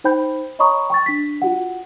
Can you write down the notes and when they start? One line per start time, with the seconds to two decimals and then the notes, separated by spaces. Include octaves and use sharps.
0.04 D#4 C5 G5 B5 G6
0.59 C#5 D#5 A#5 B5 C#6 D#6
0.90 G5 C#6 A6
1.06 D4 B6
1.42 F4 F#4 F#5